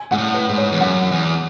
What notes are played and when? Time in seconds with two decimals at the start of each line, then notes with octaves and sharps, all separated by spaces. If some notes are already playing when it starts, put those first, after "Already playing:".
Already playing: G#5
0.11 G#2 F#5
0.18 A2
0.34 B4
0.49 G#2
0.57 C#5
0.72 E2
0.80 F#2 F#5
1.11 E2